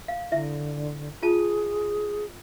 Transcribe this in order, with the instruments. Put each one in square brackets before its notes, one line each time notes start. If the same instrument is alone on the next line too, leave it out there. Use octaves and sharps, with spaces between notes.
[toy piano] F5
[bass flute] D3 [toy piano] E4 E5
[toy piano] F4 A5 [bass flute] G#4